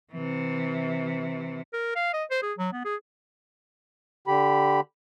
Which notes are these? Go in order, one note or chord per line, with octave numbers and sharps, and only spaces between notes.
C3 E3
A#4
F5
D#5
C5
G#4
F#3
B3
G#4
D3 G4 B5